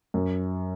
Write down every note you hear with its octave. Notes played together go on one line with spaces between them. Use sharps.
F#2